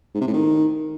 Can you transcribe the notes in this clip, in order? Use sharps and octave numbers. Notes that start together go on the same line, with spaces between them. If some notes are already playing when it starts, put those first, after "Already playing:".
G#2
C3
A2
D#3